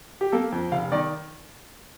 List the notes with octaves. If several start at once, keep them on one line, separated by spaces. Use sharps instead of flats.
G4
A#3 A4
F2
F1 F5
D#3 D5